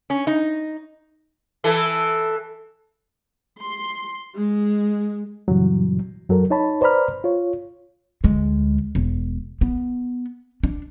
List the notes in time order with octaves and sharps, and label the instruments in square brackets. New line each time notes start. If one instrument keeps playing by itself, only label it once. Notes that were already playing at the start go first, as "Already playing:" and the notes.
[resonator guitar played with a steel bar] C#4
D#4
[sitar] E3 A4
[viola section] C6
G#3
[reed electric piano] F#2 A#2 C#3 E3 F#3 G3
F#2 F#3 A4 A#4
D#4 C#5 A5 B5
B4 C5 D5 A#5 B5 F6
F4 C#5
[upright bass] D2 G#3
E1
B3
D4